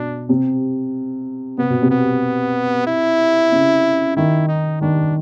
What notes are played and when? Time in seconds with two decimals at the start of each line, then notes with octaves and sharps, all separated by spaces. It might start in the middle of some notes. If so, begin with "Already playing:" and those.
Already playing: B2 D4
0.29 C3
1.58 C3 B3
1.70 B2
1.82 C3
1.91 B3
2.87 E4
3.52 C#3
4.16 D#3 E4
4.48 D#4
4.81 D#3 D4